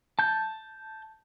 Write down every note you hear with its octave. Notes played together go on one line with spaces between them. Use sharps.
A5 G6